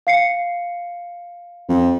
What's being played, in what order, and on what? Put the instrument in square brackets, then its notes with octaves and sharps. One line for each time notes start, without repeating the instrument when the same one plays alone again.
[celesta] F5 C7 C#7
[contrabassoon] F2